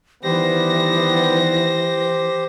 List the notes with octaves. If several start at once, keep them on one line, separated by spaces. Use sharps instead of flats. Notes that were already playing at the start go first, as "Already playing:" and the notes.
D#3 E3 G3 B3 G4 C5 A#6